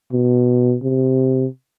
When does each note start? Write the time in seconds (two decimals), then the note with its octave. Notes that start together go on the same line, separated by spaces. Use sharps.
0.12 B2
0.83 C3